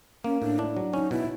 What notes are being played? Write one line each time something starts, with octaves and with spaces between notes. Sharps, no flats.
A#3 C#4
A2 D4
D4 E4
F#3
C#4 D#4
B2 E4